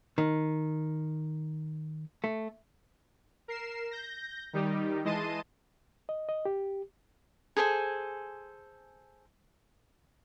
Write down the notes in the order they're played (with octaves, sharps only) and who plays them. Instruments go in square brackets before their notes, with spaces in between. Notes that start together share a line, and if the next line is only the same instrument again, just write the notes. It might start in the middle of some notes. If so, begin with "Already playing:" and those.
[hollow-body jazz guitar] D#3
A3
[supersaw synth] A#4 C7 E7
G6 A#6
D#3 G3 D#4 G4
E3 G#3 D#5 A5 C6 D#7
[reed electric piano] D#5
D#5
G4
[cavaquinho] G#4 A4 C5 G#5